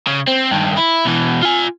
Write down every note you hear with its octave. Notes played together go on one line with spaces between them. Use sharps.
C#3
C4
G2 D#3
E4
B2 E3
F4 G#5